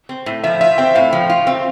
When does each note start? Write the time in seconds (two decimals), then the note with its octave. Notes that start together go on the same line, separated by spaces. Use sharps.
0.09 C4
0.26 A2
0.44 F3 E5
0.61 F4 E5
0.78 C4 G5
0.95 A2 F5
1.13 F3
1.30 F4
1.47 C4